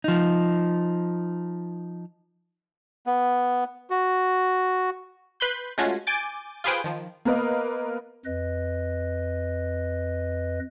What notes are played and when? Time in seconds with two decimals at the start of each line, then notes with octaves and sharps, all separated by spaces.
0.04 F3 D#4
3.07 B3
3.90 F#4
5.40 B4 B5 C6 G6
5.78 G#3 A3 C#4 F4 F#4
6.07 G#5 D6 G6 A6
6.64 F4 G4 G#4 B4 C5 G5
6.84 D#3 F3
7.25 A#3 B3 A#4 B4 D#5 F5
8.25 F2 B4 D#5